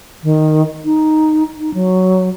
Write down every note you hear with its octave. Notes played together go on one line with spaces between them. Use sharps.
D#3
D#4
D#4
F#3